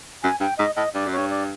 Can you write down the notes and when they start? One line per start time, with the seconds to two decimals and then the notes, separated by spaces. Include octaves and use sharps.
0.23 F#2 G#5
0.40 G2 G5
0.58 G#2 D#5
0.77 A2 D#5
0.94 G2 D5
1.06 F#2
1.13 G2 C#5
1.31 D5